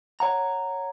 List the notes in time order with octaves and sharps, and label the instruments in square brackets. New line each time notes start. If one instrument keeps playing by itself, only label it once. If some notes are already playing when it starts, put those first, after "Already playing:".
[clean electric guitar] C#5 F#5 A#5